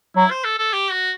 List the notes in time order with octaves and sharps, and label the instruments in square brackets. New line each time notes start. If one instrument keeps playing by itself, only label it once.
[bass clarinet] F#3 [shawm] E4
[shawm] C5
A4
A4
G4
F#4